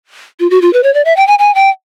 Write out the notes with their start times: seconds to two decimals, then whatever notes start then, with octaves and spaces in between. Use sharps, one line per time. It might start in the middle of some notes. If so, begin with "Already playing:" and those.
0.40 F4
0.50 F#4
0.62 F4
0.73 B4
0.83 C#5
0.94 D5
1.05 E5
1.17 G5
1.27 G#5
1.39 G#5
1.55 G5